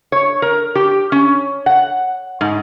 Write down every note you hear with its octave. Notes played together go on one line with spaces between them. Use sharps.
C#5
A#4
G4
C#4
F#5
G#2